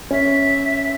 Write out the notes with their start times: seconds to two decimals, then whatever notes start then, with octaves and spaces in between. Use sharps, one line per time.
0.11 C#4 E5